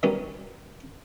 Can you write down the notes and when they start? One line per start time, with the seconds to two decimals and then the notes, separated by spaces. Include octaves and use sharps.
0.03 D#3 F#3 G3 B3 C#4